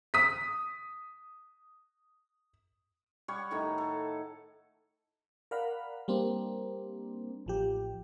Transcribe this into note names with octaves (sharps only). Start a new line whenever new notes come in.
D#6 B6
G3 C#5 F#5 C#6
A2 D#3 A#5
A4
A#4 D5 F5 F#5 B5
G3 A#3 C4 D4
A1 F3 G4